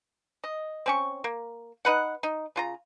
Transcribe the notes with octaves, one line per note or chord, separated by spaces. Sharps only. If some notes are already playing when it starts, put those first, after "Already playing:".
D#5
C4 C#4 C#6
A#3
D#4 B4 F#5
D#4
C#3 F4 A#5